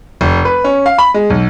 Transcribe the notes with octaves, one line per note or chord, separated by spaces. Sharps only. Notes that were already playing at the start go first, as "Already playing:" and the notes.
F1
B4
C#4
F5
B5
G#3
B1